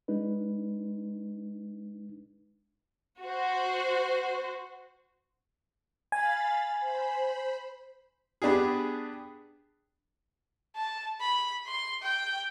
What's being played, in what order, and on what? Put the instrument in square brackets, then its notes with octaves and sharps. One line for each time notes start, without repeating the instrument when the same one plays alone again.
[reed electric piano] G#3 D4 D#4 B4
[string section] F#4 C5
[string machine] F5 B5 A6 [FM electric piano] G#5
[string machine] C5 B5
[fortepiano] B3 D4 G4 G#4
[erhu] A5
B5
C6
G5